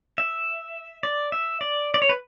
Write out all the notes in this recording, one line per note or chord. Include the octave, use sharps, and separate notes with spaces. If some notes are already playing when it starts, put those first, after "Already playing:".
E5
D5
E5
D5
D5
C#5
B4